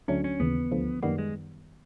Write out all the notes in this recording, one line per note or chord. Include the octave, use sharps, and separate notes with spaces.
D2 D3 F#3 A3 C#4 D4
C#4
D#2 C#3 E3 B3
D2 D3 F3
F#2 D#3 G3 A#3 B3
G#3